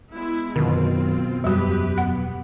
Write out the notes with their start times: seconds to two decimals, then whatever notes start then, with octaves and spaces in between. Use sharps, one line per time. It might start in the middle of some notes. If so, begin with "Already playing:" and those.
0.12 G#3 B3 E4
0.56 F#2 B2 D3 D#3 C4 F4
1.44 E1 F#2 G3 F#4 G4 B4
1.98 B3 F#5